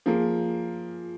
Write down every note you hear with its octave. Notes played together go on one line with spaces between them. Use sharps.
F3 A#3 G#4